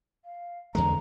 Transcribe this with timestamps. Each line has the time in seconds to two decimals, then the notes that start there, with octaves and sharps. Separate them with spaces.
0.25 F5
0.75 E2 D3 G#3 A#5